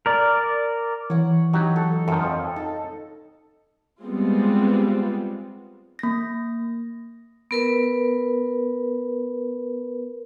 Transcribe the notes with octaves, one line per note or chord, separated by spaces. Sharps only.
A#4 D5
E3 C#5 F#5
F#3 D#4 F#4 G4
A4
F#2 D#3 A4
F2 F3
D#4 A4
G3 G#3 B3 C4 F4
A#3 A#6
B3 A#4 B4